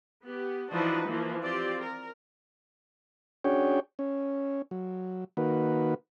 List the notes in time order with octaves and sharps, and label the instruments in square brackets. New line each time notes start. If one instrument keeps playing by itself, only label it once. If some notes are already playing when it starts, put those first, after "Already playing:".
[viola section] B3 G4
E3 F3 D4 D#4 F#4 B4
E3 F3 A#3
C4 F4 G4 D5
A#4
[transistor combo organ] C#4 D4 F#4 G#4 C#5 G5
C#4
F#3
D#3 A#3 F#4 B4